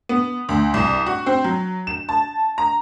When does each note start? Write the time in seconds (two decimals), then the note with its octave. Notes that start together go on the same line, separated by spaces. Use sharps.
0.09 B3
0.49 D2
0.74 C2
1.06 F#4
1.26 C4
1.44 F#3
1.87 E7
2.09 A5
2.58 A#5